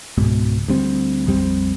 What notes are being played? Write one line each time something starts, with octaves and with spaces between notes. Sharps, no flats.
C#2 G#2 B2
D2 G3 C4
A#1 F2 G3 C4